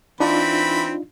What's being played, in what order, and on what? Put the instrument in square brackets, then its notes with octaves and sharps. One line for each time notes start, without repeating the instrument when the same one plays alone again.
[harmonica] E3 C4 B5 [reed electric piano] D4 D#4 F4